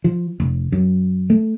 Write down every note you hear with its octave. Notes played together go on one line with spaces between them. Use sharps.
F3
F1
F#2
A3